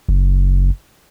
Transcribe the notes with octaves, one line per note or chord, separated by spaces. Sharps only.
F#1